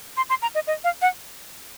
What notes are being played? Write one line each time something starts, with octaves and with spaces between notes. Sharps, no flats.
C6
C6
A#5
D#5
D#5
F5
F#5